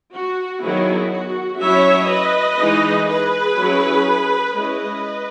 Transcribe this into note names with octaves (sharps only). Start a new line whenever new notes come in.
F#4
D#3 F#3 B3 D#4 E4 G#4
F#4
F#3 C#4 E4 C#5 E5
B4 D#5
E3 G#3 D#4
G#4 B4
F#3 C#4 E4
G#3 C#4 E4 B4 D#5